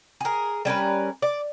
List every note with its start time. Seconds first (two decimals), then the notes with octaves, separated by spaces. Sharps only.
0.21 G#4 A#4
0.65 G3 C#4 A#4 B4
1.22 D5